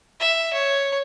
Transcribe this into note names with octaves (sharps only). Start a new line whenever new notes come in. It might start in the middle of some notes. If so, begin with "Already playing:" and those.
E5
C#5